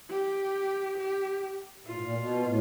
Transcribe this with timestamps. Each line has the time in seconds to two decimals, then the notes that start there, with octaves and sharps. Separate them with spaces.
0.10 G4
0.98 G4
1.87 A#2 F4
1.93 A2
2.01 A#2
2.16 B2
2.46 A2